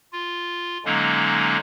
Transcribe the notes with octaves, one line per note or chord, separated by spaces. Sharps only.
F4
D3 F#3 G#3 A#3 C#4 D#4